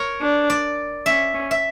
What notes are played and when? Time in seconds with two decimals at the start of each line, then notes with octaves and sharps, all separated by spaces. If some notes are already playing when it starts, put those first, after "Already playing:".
Already playing: A#4 C#5
0.21 D4
0.50 D5
1.06 C#4 E5
1.34 C#4
1.51 E5